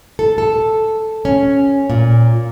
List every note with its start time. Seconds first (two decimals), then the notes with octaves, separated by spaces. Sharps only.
0.19 A4
0.38 A4
1.25 C#4
1.90 A#2